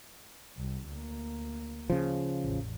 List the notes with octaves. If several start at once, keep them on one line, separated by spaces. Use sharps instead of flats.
C2
D2 A#3
C#3 F3
A1 E2